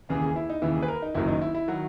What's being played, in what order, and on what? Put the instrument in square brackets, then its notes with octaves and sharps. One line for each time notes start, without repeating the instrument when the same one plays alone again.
[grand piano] D#2 C#3 E3 G#4
G#4
E4
D#4
D#2 C#3 E3 E4
G#4
B4
A#4
D#4
F#1 F#2 D#3 F#3 E4
D#4
E4
E4
D#3 F#3 F#4